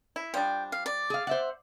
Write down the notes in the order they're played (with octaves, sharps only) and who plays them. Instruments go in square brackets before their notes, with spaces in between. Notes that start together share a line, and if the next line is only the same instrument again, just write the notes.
[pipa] E4
[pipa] F3 G3 D4 [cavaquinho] G5
[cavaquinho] F5
D5
[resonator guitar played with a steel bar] G#4 F5
C5 E5 F#5